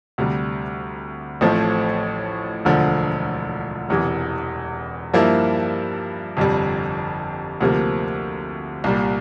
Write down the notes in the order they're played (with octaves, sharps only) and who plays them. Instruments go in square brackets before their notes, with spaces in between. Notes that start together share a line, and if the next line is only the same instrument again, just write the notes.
[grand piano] D2 C3 G3
A1 A2 F3 A3 C4
E1 D2 D3 F3
E1 E2 C3 E3
G2 F3 A#3 E4
G1 F2 C3 G3
D2 C3 F3 A#3
C2 A#2 G3